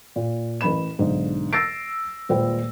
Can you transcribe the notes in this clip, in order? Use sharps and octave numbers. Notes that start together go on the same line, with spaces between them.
A#2
A1 A#4 B5 E7
B1 G#2 D3
E6 A6 A#6 C7 D7
D#1 A#2 G#3 B4 C5 G5